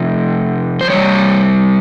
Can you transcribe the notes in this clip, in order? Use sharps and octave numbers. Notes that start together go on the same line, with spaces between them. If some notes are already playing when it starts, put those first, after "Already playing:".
Already playing: C3 F3
C5
C3 G3 C#5